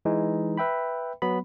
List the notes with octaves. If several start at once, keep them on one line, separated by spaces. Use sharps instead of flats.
E3 G#3 D#4
B4 E5 G5 B5
F#3 B3 B5